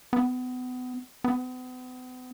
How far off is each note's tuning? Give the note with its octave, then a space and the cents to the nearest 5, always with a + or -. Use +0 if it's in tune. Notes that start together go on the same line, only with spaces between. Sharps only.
B3 +30
B3 +40